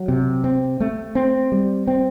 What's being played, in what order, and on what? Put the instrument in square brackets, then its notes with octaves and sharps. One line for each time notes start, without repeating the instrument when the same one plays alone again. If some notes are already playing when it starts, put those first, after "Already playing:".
Already playing: [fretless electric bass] F#3
C3
C4
A3
C4
G3
C4